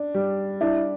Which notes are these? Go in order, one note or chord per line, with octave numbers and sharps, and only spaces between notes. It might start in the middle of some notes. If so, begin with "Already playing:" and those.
Already playing: D4
G3
D4 E4 E5